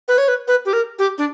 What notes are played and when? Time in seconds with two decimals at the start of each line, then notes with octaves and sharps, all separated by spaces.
0.08 B4
0.18 C#5
0.28 B4
0.48 B4
0.66 G4
0.73 A#4
0.99 G4
1.18 D4